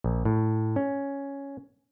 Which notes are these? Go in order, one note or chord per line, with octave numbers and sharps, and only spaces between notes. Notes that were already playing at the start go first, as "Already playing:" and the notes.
A#1
A2
C#4